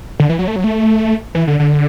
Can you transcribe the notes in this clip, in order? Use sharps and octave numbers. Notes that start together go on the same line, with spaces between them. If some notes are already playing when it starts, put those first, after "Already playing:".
D3
E3
F#3
A3
F#3
A3
E3
D3
D3